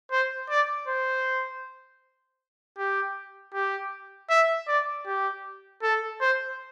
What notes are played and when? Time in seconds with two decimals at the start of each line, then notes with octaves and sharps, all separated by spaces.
0.12 C5
0.50 D5
0.88 C5
2.78 G4
3.54 G4
4.30 E5
4.68 D5
5.06 G4
5.83 A4
6.21 C5